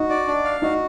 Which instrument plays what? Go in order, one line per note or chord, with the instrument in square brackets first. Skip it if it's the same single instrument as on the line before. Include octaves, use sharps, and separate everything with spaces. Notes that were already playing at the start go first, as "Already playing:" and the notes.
Already playing: [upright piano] D#4 D#5 [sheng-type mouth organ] F#4
[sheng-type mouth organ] D5
D4
F5
[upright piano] D#4 D#5 [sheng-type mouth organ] F#4